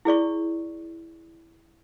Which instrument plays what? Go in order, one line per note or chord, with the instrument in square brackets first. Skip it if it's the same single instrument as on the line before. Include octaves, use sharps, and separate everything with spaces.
[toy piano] E4 G#4 D5 C#6